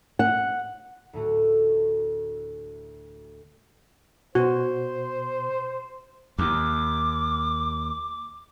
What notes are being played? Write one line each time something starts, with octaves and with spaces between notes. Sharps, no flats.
F#5
D2 A2 A3 F#4
B2 F#4 C5
D#2 D6